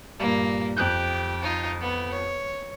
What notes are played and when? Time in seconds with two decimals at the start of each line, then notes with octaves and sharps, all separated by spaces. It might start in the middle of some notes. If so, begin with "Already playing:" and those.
0.20 G2 A#2 A#3
0.76 F2 G4 F#6 G6
1.42 D#4 F4
1.81 B3
2.11 C#5